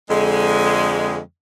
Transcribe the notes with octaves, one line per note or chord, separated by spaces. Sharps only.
F2 D3 G#3